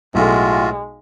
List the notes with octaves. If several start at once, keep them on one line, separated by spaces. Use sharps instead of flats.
B1 A2 G#3 F4 F#4 A4